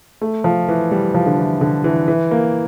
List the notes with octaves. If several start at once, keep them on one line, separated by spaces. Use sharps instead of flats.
A3
F3
E3
G3
F3
D3
E3
D3
E3
E3
A#3